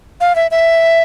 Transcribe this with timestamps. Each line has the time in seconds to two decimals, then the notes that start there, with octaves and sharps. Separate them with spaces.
0.21 F5
0.36 E5
0.51 E5